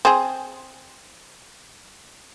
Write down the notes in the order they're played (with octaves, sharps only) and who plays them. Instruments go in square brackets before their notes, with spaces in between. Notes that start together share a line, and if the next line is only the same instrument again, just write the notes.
[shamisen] C4 G#4